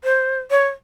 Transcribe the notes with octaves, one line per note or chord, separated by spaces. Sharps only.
C5
C#5